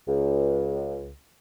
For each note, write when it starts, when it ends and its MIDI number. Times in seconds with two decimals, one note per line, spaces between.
0.08 1.12 37